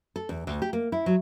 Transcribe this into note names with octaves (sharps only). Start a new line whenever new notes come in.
A4
E2
D2
G4
A#3
E4
F#3